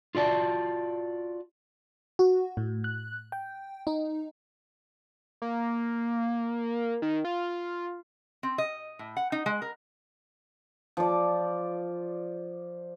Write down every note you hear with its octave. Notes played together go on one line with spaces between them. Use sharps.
F4 F#4 D5 A5
F#4
A2
F#6
G5
D#4
A#3
D#3
F4
C4
D#5
A2
F#5
D#4
G#3
A#4
F3 D5